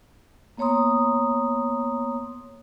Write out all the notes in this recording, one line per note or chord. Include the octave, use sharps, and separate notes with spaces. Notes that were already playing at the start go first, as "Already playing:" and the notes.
A#3 B3 C#5 A#5 C6 D#6